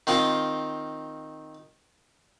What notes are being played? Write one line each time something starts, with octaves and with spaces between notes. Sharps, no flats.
D#3 C4 F4